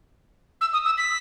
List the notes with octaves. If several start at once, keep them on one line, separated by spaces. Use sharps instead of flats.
E6
D#6
E6
B6